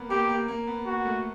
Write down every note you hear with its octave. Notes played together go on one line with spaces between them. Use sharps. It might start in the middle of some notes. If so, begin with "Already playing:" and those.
Already playing: A#3 B3
A#3 G4
A#3
A#3
B3
A#3 F#4
A3